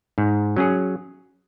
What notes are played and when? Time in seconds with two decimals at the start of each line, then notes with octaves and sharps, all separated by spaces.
0.18 G#2
0.56 F#3 C#4 G#4